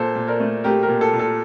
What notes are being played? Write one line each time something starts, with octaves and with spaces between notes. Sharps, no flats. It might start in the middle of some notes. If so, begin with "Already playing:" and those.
Already playing: A#2 A4 C5
A#2
A#4 D5
A3
A3 G4 A#4
G4 A#4
A#2
A4
A#2
A4